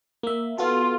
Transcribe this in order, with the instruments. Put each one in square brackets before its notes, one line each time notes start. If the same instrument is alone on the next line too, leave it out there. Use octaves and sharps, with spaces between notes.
[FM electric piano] A#3 E5
[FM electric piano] B3 F#4 A4 [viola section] F4